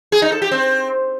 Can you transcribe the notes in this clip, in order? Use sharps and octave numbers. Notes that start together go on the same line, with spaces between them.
G#4
D#4
A4
G4
C4